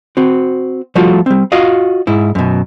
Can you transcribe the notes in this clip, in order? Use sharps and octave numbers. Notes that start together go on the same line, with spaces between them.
C4 F#4
F3 G3 A3 F4 F#4
G3 C4
F4 F#4 D#5 F5
G#2 E4
F#2 B2